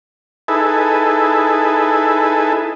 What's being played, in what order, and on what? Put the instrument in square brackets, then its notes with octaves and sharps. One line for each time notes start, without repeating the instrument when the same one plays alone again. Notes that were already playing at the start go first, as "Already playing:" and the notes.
[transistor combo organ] D#4 E4 G#4 A4 B4